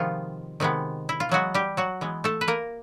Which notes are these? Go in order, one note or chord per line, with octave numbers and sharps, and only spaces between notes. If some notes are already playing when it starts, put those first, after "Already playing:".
Already playing: C3 D#3 F3 G#3 B3 F4
C3 D#3 G#3 B3
E4
F4
E3 F#3 G#3 B3 F#4
G3 G4
F#3 F#4
E3 G#3 B3
A3 A4
B4
A#3 A#4